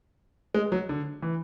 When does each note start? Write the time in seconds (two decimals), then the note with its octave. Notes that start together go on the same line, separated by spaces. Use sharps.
0.54 G#3
0.72 F#3
0.89 D3
1.22 E3